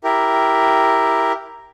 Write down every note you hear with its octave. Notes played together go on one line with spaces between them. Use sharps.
E4 G4 A#4